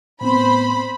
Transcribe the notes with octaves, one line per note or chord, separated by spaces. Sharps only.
A2 B3 C4 C5 B5